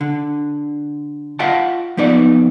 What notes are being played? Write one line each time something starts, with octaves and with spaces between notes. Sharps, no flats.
D3
F4 D#5 F#5 G5 A5
F3 B3 D#4 D5